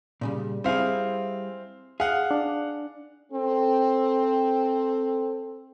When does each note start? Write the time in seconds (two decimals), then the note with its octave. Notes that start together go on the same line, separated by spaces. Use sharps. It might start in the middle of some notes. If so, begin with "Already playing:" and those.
0.21 A#2 C#3 G3
0.64 G3 C4 E4 G#4 F5
2.00 G#4 F5 F#5
2.31 D4
3.32 C4 A4